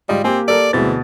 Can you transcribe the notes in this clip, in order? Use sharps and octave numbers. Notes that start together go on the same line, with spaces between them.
G#2 G3 F4 D#5
A#3 C4 G4 G#5
A4 A#4 D5
D2 B2 E3 G#3 C4 A6